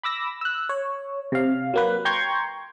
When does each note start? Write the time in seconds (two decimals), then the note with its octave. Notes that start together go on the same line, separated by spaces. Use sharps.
0.03 B5 D6 E6 A#6
0.41 E6 F#6
0.69 C#5
1.32 C3 F5
1.74 F#3 A#3 B4
2.05 G5 A#5 C6 C#6 G6 G#6